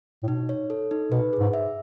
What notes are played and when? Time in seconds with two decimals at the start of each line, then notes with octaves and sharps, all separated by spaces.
0.23 A2
0.28 B2 D#4
0.49 C#5
0.70 A4
0.91 D#4
1.11 B2 B4
1.33 G#4
1.40 G#2
1.53 E5